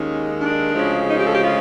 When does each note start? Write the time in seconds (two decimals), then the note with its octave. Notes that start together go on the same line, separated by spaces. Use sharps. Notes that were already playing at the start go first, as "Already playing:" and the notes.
Already playing: D#2 D#3 G#3 C#4
0.41 D4
0.75 D2 C#3 F3 G#3
1.10 D#4
1.18 G4
1.27 A4
1.35 G4
1.45 F4